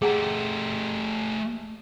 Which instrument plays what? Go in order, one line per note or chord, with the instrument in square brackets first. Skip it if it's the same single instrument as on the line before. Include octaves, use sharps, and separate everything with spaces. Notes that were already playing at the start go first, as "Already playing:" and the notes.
[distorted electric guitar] A3 G4 [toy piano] G#4 F#5 A#5